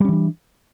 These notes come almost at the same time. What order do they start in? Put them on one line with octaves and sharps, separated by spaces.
G3 C#4 E3 D4